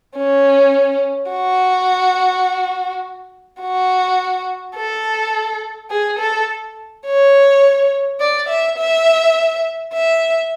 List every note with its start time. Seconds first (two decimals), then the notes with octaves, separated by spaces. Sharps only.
0.17 C#4
1.31 F#4
3.61 F#4
4.76 A4
5.91 G#4
6.19 A4
7.06 C#5
8.20 D5
8.49 E5
8.78 E5
9.93 E5